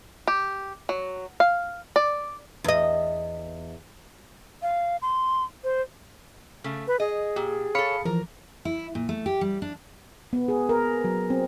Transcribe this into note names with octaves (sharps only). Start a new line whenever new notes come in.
G4
F#3
F5
D5
E2 D#5
F5
C6
C5
C#3 A3
B4
G#4 D#5
A#2 G4
A4 C#5 F5 B5 C#7
E3 F3 A#4
E4
A#2
A3
G4
G3
D4
B3
G#4
A#4
F#3
C4